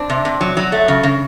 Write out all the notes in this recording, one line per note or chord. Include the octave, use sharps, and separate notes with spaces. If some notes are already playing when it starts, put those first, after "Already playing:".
Already playing: C4 D4
C3
C3
F#3
F#3
A3
C#3
C#3